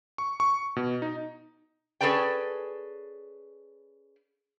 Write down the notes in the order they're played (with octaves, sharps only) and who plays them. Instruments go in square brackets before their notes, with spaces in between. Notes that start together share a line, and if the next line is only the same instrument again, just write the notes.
[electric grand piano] C#6
C#6
B2
D#4
[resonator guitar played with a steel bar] C#4 G#4 A4 B4 D5 G5